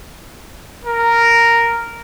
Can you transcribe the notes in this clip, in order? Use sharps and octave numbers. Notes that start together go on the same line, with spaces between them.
A#4